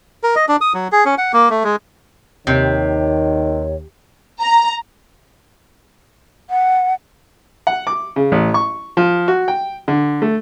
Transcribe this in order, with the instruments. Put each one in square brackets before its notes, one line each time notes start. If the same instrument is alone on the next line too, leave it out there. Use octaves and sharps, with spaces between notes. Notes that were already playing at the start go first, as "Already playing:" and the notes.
[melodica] A#4
D#5
D4
D#6
F#3
G#4
C#4
F#5
A#3
A3
G#3
[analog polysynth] D#2 [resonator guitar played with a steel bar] C3 [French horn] D#3 [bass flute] C#5
[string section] A#5
[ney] F#5
[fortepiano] F#5
D6
C#3
A1
C#6
F3
F#4
G5
D3
A3